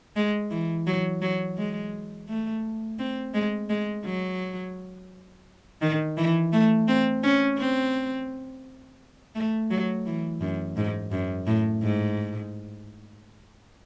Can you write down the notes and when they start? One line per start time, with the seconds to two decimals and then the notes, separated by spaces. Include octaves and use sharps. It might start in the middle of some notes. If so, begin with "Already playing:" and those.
0.16 G#3
0.51 E3
0.87 F#3
1.22 F#3
1.57 G#3
2.29 A3
2.99 C4
3.34 G#3
3.70 G#3
4.05 F#3
5.82 D#3
6.17 E3
6.53 A3
6.88 C4
7.23 C#4
7.58 C4
9.35 A3
9.71 F#3
10.06 E3
10.41 F#2
10.77 G#2
11.12 F#2
11.47 A2
11.83 G#2